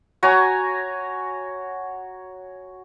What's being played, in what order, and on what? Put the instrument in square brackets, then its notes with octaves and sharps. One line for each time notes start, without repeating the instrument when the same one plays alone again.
[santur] F#4 C#5 G#5 A#5